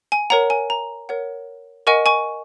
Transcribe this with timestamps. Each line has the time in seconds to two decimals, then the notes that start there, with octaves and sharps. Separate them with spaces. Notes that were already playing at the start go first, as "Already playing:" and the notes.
0.12 G#5
0.30 A#4 C#5 F#5 A#5
0.50 G#5
0.70 A#5
1.09 A#4 C#5 F#5
1.87 A#4 D#5 F#5 G#5 C#6
2.06 G#5 C#6